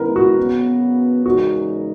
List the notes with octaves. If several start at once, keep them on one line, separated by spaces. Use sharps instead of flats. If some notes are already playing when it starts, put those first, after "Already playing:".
Already playing: D#3 G#3 B3 E4 A#4 B4
F#4
C#3 F#3 B3
E2 C#3 G#3 D#4 F#4 A#4